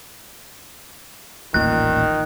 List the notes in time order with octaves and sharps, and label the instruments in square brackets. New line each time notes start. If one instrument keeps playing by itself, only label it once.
[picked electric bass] D#1 A1 A#2 [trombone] D#3 [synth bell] F#6